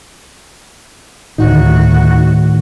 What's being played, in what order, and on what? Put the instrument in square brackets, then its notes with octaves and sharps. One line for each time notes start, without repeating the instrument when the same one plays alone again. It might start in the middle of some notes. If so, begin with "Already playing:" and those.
[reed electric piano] D2 D#4 [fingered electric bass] A2 D#3 [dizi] F#4